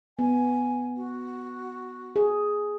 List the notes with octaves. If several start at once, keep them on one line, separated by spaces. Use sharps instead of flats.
B3 G#5
F#4
G#4